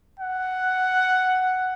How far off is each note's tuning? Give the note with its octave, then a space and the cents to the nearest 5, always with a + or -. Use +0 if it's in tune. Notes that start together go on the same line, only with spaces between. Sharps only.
F#5 +5